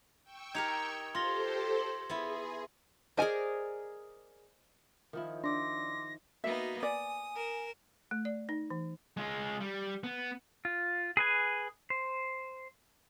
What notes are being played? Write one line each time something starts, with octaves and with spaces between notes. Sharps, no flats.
G5 C#6 E6
D#4 G4 A#4 G#6 C#7 F7
F4 G4 A4 C5 C6 A#6 G7
C6
B3 E4 G#4
G#4 A#4 C5 D5 D#5 G#5
D#3 F3 E4
D4 C6 D6 E6 A#6
A#3 B3 D#4 F#4 E5
D5 G#5 D#6
A#4 E7
A3
D5
D#4
E3
G#3 F4
G3
B3
F4
G#4 B4 G#5
C5